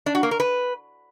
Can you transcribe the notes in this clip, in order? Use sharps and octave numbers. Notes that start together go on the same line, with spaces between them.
D4
F#4
A#3
A#4
B4